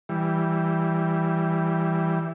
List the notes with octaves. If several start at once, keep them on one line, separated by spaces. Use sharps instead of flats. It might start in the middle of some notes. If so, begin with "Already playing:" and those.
E3 G3